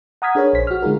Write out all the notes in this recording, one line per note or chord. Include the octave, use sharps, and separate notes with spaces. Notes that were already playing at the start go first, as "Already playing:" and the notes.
F#5 A#5 D#6 F6 G#6 B6
D4 G#4 A#4 B4 C#5
A#1 C5 B6
F#4 F6
D3 G#3 D#4 F4 G#4 A#4